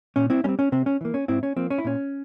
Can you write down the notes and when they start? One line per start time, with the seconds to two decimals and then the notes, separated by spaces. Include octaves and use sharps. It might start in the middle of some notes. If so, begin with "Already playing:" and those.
0.16 A#2 C#4
0.30 C4 E4
0.44 G3 C#4
0.49 C4
0.59 C#4
0.72 C3 C4
0.86 C#4
1.01 E3 A#3
1.14 C#4
1.28 G#2 C4 E4
1.43 C#4
1.57 F3 A#3 C4
1.70 C#4
1.78 E4
1.85 A#2 C#4